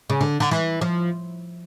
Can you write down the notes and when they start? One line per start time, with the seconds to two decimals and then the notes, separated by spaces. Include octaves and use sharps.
0.10 C#3
0.21 D3
0.40 D3
0.51 E3
0.81 F3